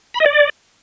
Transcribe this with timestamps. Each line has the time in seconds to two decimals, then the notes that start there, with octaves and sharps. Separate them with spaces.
0.14 B5
0.20 D#5
0.26 D5